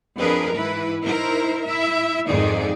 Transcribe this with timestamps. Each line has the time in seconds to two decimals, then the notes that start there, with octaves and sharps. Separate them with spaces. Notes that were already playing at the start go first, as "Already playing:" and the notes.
0.17 F2 D4 G#4 A#4 B4
0.55 G#2 E3 E4 B4
1.01 D#4 E4 A#4 C5
1.66 E4 E5
2.29 F2 G#2 D#3 D#4 G#4 D5